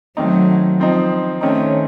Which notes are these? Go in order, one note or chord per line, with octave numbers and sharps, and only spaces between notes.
D#3 F#3 A3 C4 D#4
F3 C4 D#4
D#3 A3 C4 C#4 D#4